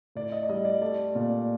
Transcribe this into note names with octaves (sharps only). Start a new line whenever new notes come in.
A2 D5
D#5
D5
G3 D#5
D5
A3 D5
A#2